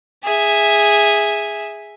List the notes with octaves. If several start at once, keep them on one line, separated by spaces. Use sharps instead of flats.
G#4 E5